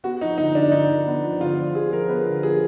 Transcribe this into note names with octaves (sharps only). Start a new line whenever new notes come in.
B3 F#4
F3 D#4
D3 D#4
D3 D4
D3 D#4
D3
B3
F3
D3 F4
F3
F3 G#4
F3 A#4
B3 B4
D3 A#4
F3 G#4